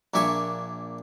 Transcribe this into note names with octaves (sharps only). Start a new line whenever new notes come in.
A#1 A#2 D4 E5 G#5 C#6